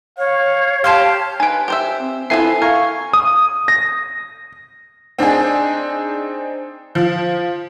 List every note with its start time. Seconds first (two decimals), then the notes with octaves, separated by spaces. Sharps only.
0.18 C#5 F5
0.84 G4 F5 A5 C6 G6
1.40 D#4 B4 G#5 D7
1.68 G4 C5 E5
2.00 C4
2.30 B3 C4 E4 F4 A4 E5 G#5 C7
2.62 A#4 F5 C#6 F6 G#6
3.13 D#6
3.68 A#6
5.19 C4 D4 D#4 G#4
6.95 F3